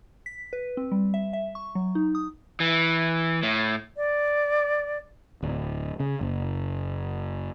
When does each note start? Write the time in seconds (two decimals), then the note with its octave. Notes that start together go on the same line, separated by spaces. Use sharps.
0.26 B6
0.53 B4
0.77 C4
0.92 G3
1.14 E5
1.33 E5
1.55 C#6
1.75 F#3
1.95 D#4
2.15 D#6
2.60 E3
3.43 A2
3.97 D5
5.42 D1
6.00 C#3
6.21 F#1